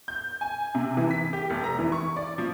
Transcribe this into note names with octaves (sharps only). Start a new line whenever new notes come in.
G6
G#5
C3
E3
B6
G4
F1
A#5
E3
C#6
D5
F3